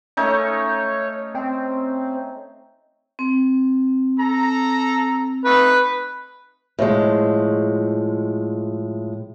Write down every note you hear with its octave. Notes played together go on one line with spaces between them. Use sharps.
A3 C#4 D#4 C#5
C4
C4
A4 A#5
A3 D#4 B4 F#5
A2 F3 G#3